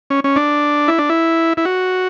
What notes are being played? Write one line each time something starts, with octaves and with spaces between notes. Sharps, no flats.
C#4
C#4
D4
E4
D4
E4
E4
F#4